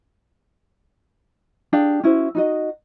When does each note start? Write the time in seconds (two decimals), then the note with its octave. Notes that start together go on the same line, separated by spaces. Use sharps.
1.73 D4 G4 G#4 F5
2.03 C#4 E4 F#4 C5
2.35 D#4 F#4 D#5